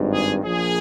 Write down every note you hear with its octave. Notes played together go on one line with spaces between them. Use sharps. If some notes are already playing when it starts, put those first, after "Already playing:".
Already playing: G#1 G2 D#3
G#4
A#1 A#2 F3 G#4